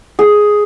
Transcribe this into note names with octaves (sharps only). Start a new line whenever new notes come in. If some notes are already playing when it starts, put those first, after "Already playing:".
G#4